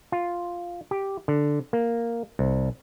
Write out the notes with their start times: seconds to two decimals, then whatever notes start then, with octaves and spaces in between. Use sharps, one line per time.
0.12 F4
0.91 G4
1.28 D3
1.73 A#3
2.39 C2